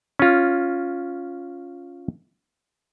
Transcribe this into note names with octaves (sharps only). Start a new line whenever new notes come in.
C#4 F4